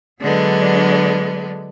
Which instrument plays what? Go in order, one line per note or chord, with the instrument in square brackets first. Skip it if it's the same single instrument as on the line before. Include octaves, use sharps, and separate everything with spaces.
[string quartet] D3 F#3 G#3 B3 D4